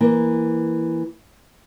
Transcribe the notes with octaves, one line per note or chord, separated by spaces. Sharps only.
E3 A#3